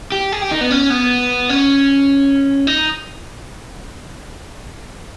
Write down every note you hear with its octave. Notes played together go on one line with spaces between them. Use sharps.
G4
G#4
G4
D#4
B3
C#4
B3
C#4
D#4